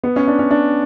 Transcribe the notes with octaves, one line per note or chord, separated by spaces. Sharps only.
B3
C#4
D4
C#4
D4